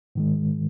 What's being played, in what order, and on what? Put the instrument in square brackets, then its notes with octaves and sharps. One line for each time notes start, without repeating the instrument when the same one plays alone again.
[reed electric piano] G#2 D#3 G#3